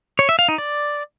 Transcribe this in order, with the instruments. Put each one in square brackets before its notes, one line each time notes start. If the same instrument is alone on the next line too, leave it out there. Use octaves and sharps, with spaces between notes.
[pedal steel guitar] C#5
E5
F5
D#4
D5